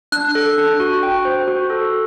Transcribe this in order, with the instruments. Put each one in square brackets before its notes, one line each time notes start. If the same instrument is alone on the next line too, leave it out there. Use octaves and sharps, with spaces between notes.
[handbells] D4 [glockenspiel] F#6
[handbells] A4
D4
F#4
G5
C5
F#4
A4